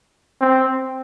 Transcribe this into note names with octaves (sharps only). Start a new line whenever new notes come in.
C4